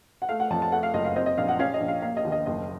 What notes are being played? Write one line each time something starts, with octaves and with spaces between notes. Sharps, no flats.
F#5
A3 F5
F#5
F2 A5
A5
A3 F#5
F5
F#1 D#5
F5
C4 D#5
D#5
A#1 F5
F#5
C#4 F5
D#5
A#1
F5
A#3 F5
D#5
D#2
D#5
F#1 D#5